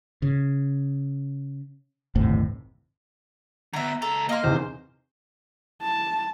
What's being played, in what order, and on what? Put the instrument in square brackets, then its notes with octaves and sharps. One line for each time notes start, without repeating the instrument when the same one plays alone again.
[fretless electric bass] C#3
G1 D#2 A2 C3
[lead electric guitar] D3 B3 [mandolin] E5 A#5
[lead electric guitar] C#2 A#5 [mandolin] A4
[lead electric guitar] A#3 [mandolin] D#5 F5 C6
[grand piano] E2 C3 D#3 [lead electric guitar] C5
[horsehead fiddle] A5